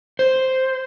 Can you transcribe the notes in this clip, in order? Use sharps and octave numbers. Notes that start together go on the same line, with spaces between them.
C5